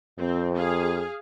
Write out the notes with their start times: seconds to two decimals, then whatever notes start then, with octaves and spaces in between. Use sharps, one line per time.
0.19 F2 C4
0.56 G#4 F5